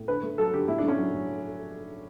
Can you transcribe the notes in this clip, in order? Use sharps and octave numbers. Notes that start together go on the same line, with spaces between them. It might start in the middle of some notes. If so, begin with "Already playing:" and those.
Already playing: A2
D3 B4
A3
F#3 A4
D3 G4
A2 E4
D4
A3
C#4
F#3
A2